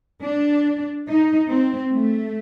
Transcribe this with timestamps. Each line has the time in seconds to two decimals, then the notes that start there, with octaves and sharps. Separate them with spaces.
0.22 D4
1.07 D#4
1.50 C4
1.92 A3